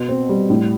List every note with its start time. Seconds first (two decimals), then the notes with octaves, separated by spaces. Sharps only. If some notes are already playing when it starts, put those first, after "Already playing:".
Already playing: B2
0.09 C4
0.29 G3
0.50 A2